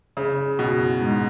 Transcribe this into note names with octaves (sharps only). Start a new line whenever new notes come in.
C#3
B2
G#2